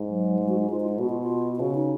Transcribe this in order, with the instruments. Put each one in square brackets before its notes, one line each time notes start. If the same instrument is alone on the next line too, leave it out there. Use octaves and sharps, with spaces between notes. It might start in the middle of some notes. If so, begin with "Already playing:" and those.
Already playing: [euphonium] G#2
[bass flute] F#3
G#3
F#4
D#4
[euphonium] G#2 [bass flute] F4
[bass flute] F4
D#4
[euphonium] B2 [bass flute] F#4
[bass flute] F4
F4
F4
[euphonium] C#3 [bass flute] F#4
[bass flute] D#4